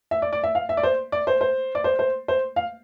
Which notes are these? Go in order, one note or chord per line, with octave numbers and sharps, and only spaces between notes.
E5
D5
D5
E5
F5
E5
D5
C5
D5
C5
C5
D5
C5
C5
C5
F5